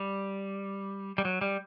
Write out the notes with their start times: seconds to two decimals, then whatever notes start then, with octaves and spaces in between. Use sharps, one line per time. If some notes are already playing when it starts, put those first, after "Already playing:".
Already playing: G3
1.18 G3
1.25 F#3
1.41 G3